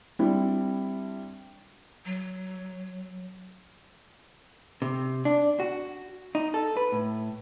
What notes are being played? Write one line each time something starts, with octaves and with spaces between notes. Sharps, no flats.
G3 C4 D4 E4
F#3
C3
D4
F#4
D#4
A4
B4
A2